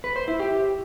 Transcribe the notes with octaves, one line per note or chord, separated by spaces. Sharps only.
B4
C5
E4
G4